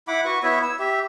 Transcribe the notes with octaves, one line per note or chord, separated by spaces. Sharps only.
E4 F#5 B5 D6
F#4 B4 C#6
B3 E4 C#5 E5
E6
G4 E5